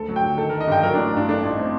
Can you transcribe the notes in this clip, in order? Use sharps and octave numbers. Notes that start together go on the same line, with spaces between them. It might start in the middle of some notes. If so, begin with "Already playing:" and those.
Already playing: D2 A4
F#3
G5
D3
D#3 A4
D#3 A#4
D#5
G2 G5
F#3 A#4
A1 D4
G2 D4
A3 D4
A1
D#4
C4